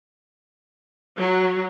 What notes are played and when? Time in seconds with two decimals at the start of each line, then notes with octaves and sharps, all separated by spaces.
1.18 F#3